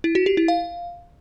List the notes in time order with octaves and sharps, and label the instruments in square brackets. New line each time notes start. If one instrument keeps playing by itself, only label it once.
[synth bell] E4
F#4
G4
E4
F5